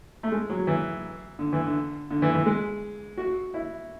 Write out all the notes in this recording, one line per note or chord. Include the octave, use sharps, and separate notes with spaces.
A3
G#3
F#3
E3
D3
E3
D3
D3
E3
E3
G#3
F#4
E4